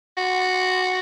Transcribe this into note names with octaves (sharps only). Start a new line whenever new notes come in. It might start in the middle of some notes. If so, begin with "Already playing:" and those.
F#4